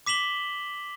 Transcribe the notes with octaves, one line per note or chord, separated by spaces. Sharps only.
D6 B6 E7 F#7 G7